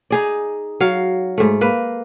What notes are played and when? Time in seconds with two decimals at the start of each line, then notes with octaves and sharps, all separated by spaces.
0.10 D#4 G#4 D5
0.80 F#3 F5
1.38 G#2 A3
1.61 A#3 B4